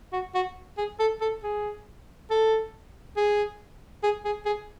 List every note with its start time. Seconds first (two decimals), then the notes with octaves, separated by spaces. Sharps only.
0.13 F#4
0.35 F#4
0.78 G#4
0.99 A4
1.21 A4
1.43 G#4
2.30 A4
3.17 G#4
4.03 G#4
4.25 G#4
4.45 G#4